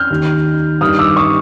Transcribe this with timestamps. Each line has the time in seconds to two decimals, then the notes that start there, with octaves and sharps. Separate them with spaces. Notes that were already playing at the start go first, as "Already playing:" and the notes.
Already playing: F6 G6
0.10 D#2 D#3
0.81 G2 D#3 D#6 F6
0.99 D6 E6
1.17 C#6 D#6